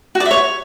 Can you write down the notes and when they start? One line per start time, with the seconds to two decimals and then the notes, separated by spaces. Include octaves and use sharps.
0.15 F#4
0.20 D5
0.25 E5
0.31 C#5